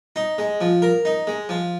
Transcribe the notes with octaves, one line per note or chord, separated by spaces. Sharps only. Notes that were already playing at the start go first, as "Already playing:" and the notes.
D#4
G#3
F3
A#4
D#4
G#3
F3